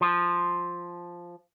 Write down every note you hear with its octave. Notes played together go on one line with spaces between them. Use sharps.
F3